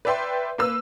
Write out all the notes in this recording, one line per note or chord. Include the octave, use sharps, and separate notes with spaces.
B4 D5 E5 G5 C6
A#3 B4 E6